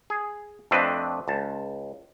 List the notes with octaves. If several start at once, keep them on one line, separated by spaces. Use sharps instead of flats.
G#4
F2 A3 C4 D4 B4 D#5
C#2 A5